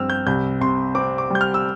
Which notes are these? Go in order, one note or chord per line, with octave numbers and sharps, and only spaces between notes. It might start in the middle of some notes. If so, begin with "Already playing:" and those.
Already playing: G2 F3 C4 E6 F6
G6
C2 G6
C3 C6
C4 D6
D6
G3 G6
F6
E6